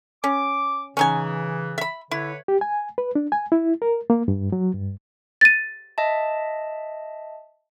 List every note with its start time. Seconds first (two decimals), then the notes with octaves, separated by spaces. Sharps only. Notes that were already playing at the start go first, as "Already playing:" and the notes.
0.24 C#4 D6
0.97 C#3 E3 C#4 D#4 G#5
1.78 E5 B5
2.11 D3 E4 B4 C#5
2.48 G4
2.61 G#5
2.98 B4
3.15 D4
3.32 G#5
3.52 E4
3.82 A#4
4.10 A#3
4.28 G2
4.52 F#3
4.74 G2
5.41 A6 D#7
5.98 D#5 E5 A5